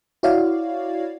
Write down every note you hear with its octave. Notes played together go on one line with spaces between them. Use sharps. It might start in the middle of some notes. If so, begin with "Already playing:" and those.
E4 F#4 C#5 D5 F5